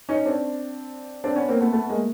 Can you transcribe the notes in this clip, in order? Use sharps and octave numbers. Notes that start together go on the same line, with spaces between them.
C#4 D#4
C4 D4
C4 D4
B3 C#4
A#3 C4
A3 B3
A3 B3
G#3 A#3